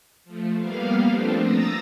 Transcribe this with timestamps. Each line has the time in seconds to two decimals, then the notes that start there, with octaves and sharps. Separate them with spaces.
0.25 F3 A3
0.56 G3 A#3 B3 F5
1.07 F3 A3 C4 D4
1.42 A#5 D#6 E6 A6 A#6